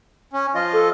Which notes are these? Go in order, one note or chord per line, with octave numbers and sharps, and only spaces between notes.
C#4
F3 F4 D#5
A4